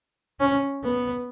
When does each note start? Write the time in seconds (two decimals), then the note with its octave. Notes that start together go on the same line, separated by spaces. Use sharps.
0.40 C#4
0.83 B3